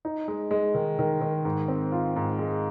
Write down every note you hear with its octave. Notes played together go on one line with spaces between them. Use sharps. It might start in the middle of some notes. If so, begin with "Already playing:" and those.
D#4
G#3
G#3
D#3
D#3
D#3
G#2
C4
F4
G#2
G#3